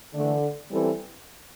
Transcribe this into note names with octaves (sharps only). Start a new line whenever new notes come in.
D3 E3 A3 D4
E3 G3 C4 E4 A4